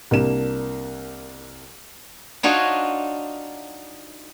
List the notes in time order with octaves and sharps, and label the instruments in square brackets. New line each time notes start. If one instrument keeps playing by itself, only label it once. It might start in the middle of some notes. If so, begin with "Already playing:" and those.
[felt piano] C2 A#3 D4 E7
[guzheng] D4 D#4 F4 F#4 C#5 D#5